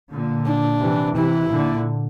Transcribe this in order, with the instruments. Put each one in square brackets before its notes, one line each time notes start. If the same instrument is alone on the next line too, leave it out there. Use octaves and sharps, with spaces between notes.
[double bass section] A#2 D3
[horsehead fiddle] D4
[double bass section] C3 E3
[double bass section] C3 E3 [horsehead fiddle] E4
[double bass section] A#2 D3